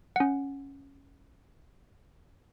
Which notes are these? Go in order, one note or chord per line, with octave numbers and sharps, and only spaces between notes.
C#4 F#5